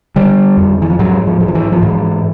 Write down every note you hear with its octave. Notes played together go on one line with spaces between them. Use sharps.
D3 G3
F2
E3
F3
G#2 F#3
F3
G#2
F3
E3
F3
G#2 E3